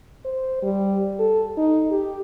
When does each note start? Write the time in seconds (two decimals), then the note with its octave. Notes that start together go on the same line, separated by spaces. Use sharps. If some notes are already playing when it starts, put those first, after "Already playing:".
0.25 C5
0.62 G3
1.19 A4
1.57 D#4
1.90 G4